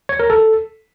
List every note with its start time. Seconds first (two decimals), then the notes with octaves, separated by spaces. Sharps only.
0.09 C#5
0.19 A#4
0.30 A4